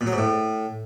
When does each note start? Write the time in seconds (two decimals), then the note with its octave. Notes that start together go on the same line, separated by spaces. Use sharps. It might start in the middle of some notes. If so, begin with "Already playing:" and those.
0.01 A#2
0.07 F#3
0.12 G#2
0.18 A2